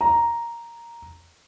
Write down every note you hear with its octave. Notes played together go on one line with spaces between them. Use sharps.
A#5